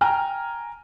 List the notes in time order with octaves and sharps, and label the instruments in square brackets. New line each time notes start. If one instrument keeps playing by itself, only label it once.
[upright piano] G5 G#5 A#5 F6